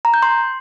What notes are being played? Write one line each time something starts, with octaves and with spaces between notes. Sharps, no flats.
A#5
G6
C6